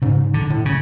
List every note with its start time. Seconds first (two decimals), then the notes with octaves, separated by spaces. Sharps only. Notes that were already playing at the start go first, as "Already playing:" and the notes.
0.02 G#2 C#3
0.34 D3
0.50 A2
0.65 C#3